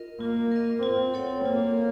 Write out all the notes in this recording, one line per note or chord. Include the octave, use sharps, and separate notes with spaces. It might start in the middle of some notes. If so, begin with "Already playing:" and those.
Already playing: F4 A#4 D#5
A#3 F4
A#4 D#5
C4 F4
A4 C#5 F#5
A#3 F4